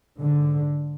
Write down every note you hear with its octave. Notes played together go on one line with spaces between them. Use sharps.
G#2 D3